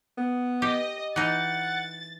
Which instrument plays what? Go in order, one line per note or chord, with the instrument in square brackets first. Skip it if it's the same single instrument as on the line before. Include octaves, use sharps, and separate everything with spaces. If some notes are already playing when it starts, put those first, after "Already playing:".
[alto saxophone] B3
[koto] G4 [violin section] D#5
[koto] E3 D#4 [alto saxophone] F#5 [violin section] A6